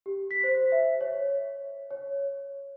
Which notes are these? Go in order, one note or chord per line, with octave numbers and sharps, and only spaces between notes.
G4
B6
C5
E5
C#5
C#5